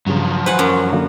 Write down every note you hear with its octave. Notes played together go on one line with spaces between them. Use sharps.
G2 C#3 F3 F#3
B4 C5 F#5 G#5 C6
F#2
D3 A#3 F#4